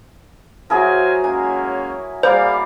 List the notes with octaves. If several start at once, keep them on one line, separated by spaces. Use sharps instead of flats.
F#3 E4 G#4 A#4 C5 F5 G#5
G#3 A#3 C#4 G#5
G3 A#3 G#4 C5 D5 F5